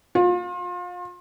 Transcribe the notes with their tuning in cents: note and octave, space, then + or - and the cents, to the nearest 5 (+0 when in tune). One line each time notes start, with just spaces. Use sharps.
F4 +35